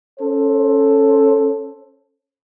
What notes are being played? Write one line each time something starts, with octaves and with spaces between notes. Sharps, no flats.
C#4 A4 C5